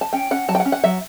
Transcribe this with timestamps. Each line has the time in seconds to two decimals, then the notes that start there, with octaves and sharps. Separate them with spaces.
0.01 A5
0.13 C#4 G5
0.31 C#4 F#5
0.48 F#3 A5
0.55 G5
0.60 F#5
0.65 C#4
0.72 F#5
0.84 F#3 E5